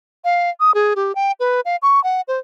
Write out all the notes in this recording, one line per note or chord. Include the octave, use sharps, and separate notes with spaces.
F5
D#6
G#4
G4
G5
B4
F5
C#6
F#5
C5